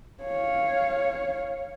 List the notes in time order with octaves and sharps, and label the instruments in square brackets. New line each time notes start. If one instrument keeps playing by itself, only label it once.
[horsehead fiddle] C#5 F5